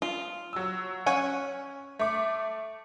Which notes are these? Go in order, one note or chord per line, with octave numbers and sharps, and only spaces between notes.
F4
F#3 E6
C#4 C#5 F#5 G#5
A3 D6